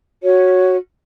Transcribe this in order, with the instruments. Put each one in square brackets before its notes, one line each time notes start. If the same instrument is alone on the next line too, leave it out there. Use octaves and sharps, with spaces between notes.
[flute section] F#4 C#5